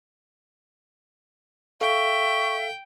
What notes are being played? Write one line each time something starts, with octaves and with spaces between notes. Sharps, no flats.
A4 E5 F5 G5 C#6